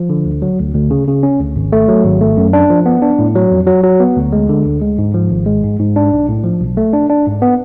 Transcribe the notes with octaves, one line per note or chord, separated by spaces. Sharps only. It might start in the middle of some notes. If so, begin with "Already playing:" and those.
Already playing: F3
D3
D2
F#3
D2
D2
C#3
C#3
C#4
D2
G#1
A3
F#3
G#1
A3
F#2
D4
F3
B3
D4
A2
F#3
F2
F#3
F#3
B3
D2
G#3
D3
D2
G#3
G#2
F3
G#1
G#3
G#2
G#2
D4
B1
A2
F3
B1
A3
D4
D4
G#2
B3